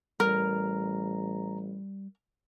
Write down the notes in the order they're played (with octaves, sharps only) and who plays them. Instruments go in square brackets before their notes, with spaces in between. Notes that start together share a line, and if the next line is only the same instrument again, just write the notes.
[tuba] A1 [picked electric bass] G3 [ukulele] A#4 [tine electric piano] A#5